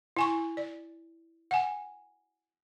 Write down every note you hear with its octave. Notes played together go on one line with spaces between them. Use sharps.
E4 G#5 C#6
D5
F#5 G#5